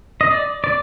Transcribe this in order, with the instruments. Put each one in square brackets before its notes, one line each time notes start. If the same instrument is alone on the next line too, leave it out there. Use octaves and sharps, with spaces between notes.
[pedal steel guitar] D#5
D5
D5